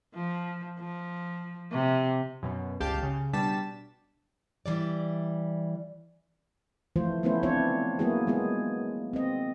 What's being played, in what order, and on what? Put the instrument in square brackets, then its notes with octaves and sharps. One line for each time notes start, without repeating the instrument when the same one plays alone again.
[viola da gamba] F3
F3
C3
[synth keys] F#2 B2
G1 C#2 G4 F5 A5 G6
C#3
B2 G3 D4 A5 B6 E7
[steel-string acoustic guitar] E3 G3 D5
[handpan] E3 F3 A3 F4 C5
A3 B3 C#4 E4 C5
C4 D4 E4 F4 C5 C#5
F#3 A#3 B3 E4 F#4 G#4
G#3 B3 F4 G#4
C4 D#5